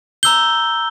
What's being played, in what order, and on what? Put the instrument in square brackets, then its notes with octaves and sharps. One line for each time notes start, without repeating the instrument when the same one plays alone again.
[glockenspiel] A#5 E6 G6 G7